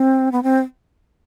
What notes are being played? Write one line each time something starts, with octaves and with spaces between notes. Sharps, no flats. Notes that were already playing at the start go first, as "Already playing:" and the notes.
Already playing: C4
B3
C4